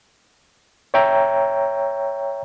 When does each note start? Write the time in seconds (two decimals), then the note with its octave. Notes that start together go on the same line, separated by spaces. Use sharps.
0.94 C#5 E5 G5 A#5